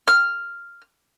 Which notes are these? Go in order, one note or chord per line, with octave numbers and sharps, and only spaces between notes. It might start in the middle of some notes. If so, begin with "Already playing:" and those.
F6